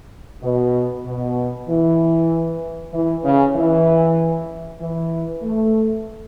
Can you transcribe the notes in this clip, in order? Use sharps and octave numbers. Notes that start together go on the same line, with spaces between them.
B2
B2
E3
E3
C#3
E3
E3
A3